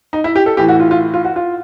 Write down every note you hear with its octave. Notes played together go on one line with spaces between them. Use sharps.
D#4
E4
G4
A4
A2 E3 G4
F#4
F4
F4
F4
F#4
F4